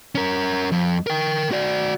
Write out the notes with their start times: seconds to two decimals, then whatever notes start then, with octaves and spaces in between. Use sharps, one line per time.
0.15 C#4 A#4
0.72 F2
1.07 A#4 G5
1.51 F#4 D5